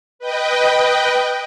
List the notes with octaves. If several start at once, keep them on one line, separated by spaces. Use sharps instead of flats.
B4 D#5 G5